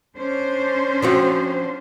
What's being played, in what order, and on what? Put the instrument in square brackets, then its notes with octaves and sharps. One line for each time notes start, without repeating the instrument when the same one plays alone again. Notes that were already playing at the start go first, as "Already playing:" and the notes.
[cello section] C#4 D4 C5
[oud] F3 C4 F#4